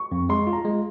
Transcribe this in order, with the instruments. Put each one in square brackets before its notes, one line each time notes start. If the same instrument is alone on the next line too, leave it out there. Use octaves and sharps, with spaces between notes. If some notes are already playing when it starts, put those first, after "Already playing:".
Already playing: [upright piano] C#6
[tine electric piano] F2
[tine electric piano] G#3 [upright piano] C6
[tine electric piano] F4
[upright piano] A#5
[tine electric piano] G#3